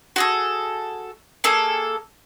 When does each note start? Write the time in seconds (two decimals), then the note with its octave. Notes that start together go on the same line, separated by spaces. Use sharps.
0.16 F#4 G#4 A4
1.44 A#3 G#4 A4